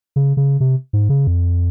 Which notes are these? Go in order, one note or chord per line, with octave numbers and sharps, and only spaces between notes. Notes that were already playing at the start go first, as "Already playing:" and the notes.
C#3
C#3
C3
G#2
C#3
F2